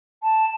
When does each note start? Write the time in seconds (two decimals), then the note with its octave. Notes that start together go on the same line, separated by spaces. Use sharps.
0.23 A5